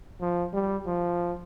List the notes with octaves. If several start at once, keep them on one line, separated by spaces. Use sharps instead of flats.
F3
G3
F3